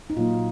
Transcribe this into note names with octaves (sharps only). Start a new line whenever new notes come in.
D#4
A#2 F#3 A#3 F4